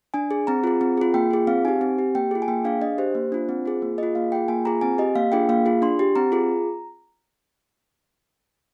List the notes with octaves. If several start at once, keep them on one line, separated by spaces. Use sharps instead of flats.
D4 G#5
G#4
C4 A#5
F4 G#4
C4
F4 G#4
A#3 G5
F4 G#4
C4 F5
D#4 G4 G#5
C4
G4
A#3 G5
F4 G#4
G#5
A#3 G5
D4 G#4 F5
D4 D#5
G4 C5
A#3
D4 F4
C4
F4 G#4
A#3
F4 G#4 D#5
A#3 F5
F4 G#4 G5
A#3 G#5
F4 G#4 A#5
C4 G#5
G4 D#5
A#3 F5
D4 F4 G#4 G5
A#3 F5
F4 G#4
D4 C6
G4
C4 A#5
F4 G#4